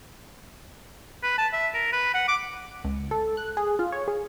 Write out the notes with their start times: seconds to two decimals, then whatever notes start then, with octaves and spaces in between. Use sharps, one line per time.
1.23 B4
1.38 A5
1.53 E5
1.74 A#4
1.93 B4
2.14 F#5
2.28 D6
2.84 C#2
3.11 A4
3.37 F#6
3.57 G#4
3.79 F4
3.92 C#5
4.08 G#4